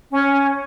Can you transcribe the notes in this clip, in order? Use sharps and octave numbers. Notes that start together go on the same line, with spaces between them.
C#4